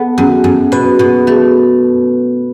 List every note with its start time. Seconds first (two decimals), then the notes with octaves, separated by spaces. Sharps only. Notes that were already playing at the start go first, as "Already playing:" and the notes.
Already playing: B3 A4
0.18 F#2
0.44 F#2
0.72 B2 B4
0.99 B2
1.27 A3